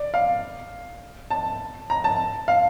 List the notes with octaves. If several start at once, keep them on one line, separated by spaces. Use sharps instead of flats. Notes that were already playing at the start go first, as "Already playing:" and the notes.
Already playing: D5
F5
A5
A#5
A5
F5